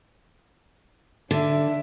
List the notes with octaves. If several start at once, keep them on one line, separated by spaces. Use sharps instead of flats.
D3 D4 E5